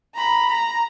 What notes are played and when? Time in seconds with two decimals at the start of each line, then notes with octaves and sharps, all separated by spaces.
0.15 A#5 B5
0.50 A#5